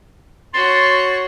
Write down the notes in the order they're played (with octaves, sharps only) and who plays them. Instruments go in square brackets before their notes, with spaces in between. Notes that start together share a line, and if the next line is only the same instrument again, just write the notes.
[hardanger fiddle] F#4 C#5 [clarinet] C6 [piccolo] A6